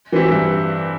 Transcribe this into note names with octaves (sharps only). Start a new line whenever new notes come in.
E3 C4 E4 G4
G2